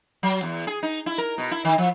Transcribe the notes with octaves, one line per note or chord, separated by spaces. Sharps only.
F#3
E2
G#4
D#4
E4
A#4
B2
E4
D#3
F3